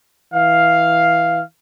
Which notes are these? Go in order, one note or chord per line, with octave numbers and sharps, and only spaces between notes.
E3 F5